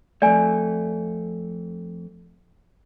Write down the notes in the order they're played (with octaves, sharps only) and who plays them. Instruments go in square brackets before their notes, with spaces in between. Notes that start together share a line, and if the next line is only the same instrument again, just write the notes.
[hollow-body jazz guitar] F2 A3 [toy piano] D5 G#5